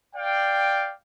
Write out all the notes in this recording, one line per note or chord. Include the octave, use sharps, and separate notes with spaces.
D5 F5 G5